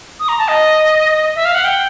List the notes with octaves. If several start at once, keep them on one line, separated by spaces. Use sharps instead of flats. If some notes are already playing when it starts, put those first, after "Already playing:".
D#6
A#5
A5
D#5
E5
F5
F#5
G5